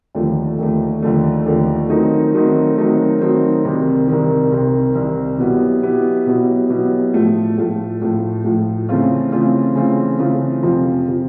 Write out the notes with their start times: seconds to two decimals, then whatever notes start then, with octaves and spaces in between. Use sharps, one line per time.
0.15 D#2 D3 F3 A3
0.59 D#2 D3 F3 A3
1.02 D#2 D3 F3 A3
1.46 D#2 D3 F3 A3
1.89 D#3 F#3 A3 C4 D#4
2.34 D#3 F#3 A3 C4 D#4
2.77 D#3 F#3 A3 C4 D#4
3.21 D#3 F#3 A3 C4 D#4
3.65 C2 C3 D#3
4.08 C2 C3 D#3
4.52 C2 C3 D#3
4.95 C2 C3 D#3
5.38 B2 F#3 B3 E4 G4
5.83 B2 F#3 B3 E4 G4
6.26 B2 F#3 B3 E4 G4
6.70 B2 F#3 B3 E4 G4
7.13 A2 F3 A3
7.58 A2 F3 A3
8.01 A2 F3 A3
8.44 A2 F3 A3
8.89 C#3 E3 A3 C4 F4
9.32 C#3 E3 A3 C4 F4
9.75 C#3 E3 A3 C4 F4
10.19 C#3 E3 A3 C4 F4
10.63 F2 C3 F3
11.08 C3 F3